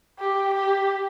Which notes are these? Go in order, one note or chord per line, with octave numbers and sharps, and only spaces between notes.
G4
G4